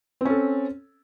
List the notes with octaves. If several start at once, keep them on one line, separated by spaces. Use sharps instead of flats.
C4 C#4 A4